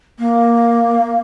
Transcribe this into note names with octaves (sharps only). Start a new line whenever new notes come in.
A#3